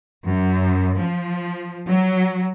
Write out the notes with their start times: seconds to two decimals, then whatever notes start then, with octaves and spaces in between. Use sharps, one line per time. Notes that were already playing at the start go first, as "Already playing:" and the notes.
0.27 F#2
0.99 F3
1.89 F#3